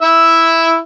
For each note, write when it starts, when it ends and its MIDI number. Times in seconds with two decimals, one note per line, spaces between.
0.02 0.79 64
0.02 0.79 76